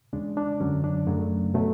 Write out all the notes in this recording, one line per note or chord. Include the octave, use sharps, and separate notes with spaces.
E2 C#3 G#3 D4
D4
F#2 D3 F#3 C#4
D4
F#2 C#3 F#3 A3
B2 F#3 A3